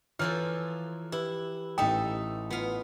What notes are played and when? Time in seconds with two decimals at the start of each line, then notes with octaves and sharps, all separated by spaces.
0.19 E3 F3 F4 A4 C#5 A#5 F6
1.12 E4 G4 B4
1.78 A1 D#4 A4 E5 G5 D#6
2.50 B3 F4 F5